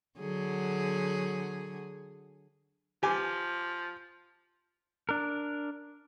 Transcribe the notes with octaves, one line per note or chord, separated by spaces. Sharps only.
D3 F#3 G#4
F3 G4 G#5
D4 A#4